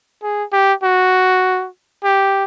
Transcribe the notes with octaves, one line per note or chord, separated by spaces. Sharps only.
G#4
G4
F#4
G4